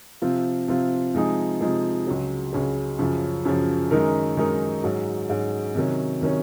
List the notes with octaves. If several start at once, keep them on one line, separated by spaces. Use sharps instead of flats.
C3 F3 C4 F4
C3 F3 C4 F4
C3 F3 G#3 D#4 G#4
C3 F3 G#3 D#4 G#4
C#2 C#3 F#3
C#2 C#3 F#3
F#2 C#3 F3
F#2 C#3 F3
F#2 D#3 G#3 D#4 A#4
F#2 D#3 G#3 D#4 A#4
G#2 F#3 C#4
G#2 F#3 C#4
C3 D#3 F#3 C#4
C3 D#3 F#3 C#4